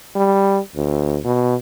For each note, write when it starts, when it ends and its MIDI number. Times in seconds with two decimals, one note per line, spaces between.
0.15 0.59 55
0.75 1.19 38
1.24 1.55 47